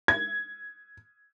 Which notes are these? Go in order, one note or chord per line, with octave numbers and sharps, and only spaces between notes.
G#6